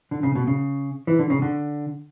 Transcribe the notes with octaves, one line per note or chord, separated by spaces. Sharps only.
D3
C#3
B2
C#3
E3
D3
C#3
D3